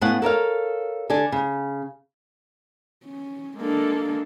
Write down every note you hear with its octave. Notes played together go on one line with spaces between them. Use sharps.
A2 B3 C#4 F5 F#5
A4 A#4 C#5 F5
D3 A4 D5 G#5
C#3
C#4
G#3 A#3 D4 A4